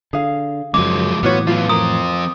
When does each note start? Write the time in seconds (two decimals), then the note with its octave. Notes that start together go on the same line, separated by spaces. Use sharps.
0.13 D3 G#4 F5
0.74 F#2 C#3 F3 G#3 D6
1.23 A2 E3 F#3 B3 F4 F#4 C#5
1.47 F3 B3 F4
1.69 F3 C4 A#4 D#6